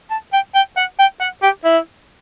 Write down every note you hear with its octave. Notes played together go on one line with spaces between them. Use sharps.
A5
G5
G5
F#5
G5
F#5
G4
E4